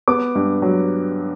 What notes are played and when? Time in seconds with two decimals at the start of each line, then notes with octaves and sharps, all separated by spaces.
0.08 B3 D6
0.35 G2
0.62 F#3